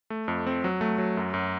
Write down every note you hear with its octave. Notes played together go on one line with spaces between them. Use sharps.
A3
F2
C4
F#3
A3
F#3
F#2
F#2